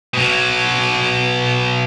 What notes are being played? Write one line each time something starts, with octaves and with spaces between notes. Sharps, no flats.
B2 F#3